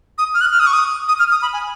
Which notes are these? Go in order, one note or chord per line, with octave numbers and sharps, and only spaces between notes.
D#6
F6
F#6
F6
D#6
C#6
D#6
D#6
F6
D#6
B5
G#5